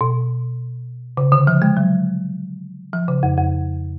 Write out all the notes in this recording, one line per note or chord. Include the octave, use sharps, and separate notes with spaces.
B2
C#3
D3
F3
G#3
F#3
F3
C#3
F2
F2